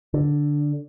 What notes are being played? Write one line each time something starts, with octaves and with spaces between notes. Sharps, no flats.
D3